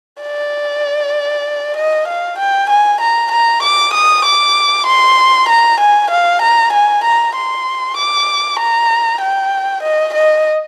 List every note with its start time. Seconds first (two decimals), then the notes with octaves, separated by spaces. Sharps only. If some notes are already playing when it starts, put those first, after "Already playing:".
0.22 D5
1.77 D#5
2.08 F5
2.39 G5
2.70 G#5
3.01 A#5
3.32 A#5
3.63 D6
3.94 D#6
4.25 D6
4.87 C6
5.49 A#5
5.80 G#5
6.11 F5
6.42 A#5
6.73 G#5
7.04 A#5
7.35 C6
7.97 D6
8.60 A#5
9.21 G5
9.83 D#5
10.14 D#5